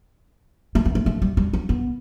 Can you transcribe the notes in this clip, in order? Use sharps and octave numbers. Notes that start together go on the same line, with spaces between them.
A3
B3
A3
A3
G3
G3
C4
B3